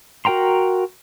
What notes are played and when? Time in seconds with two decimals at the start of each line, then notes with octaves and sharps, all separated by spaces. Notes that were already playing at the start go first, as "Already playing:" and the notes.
0.25 F#4 A#4 G5 A#5 C6